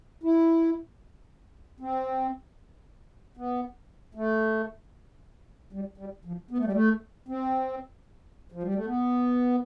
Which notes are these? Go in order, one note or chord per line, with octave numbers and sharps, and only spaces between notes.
E4
C4
B3
A3
G3
G3
F3
B3
A3
G3
A3
C4
F3
G3
A3
B3